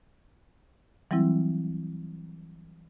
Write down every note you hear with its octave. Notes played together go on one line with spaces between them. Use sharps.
E3 F#3 G3 C4 E4